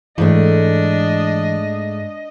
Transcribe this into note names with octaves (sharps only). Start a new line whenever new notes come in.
G#2 E3 A3 D4 D#5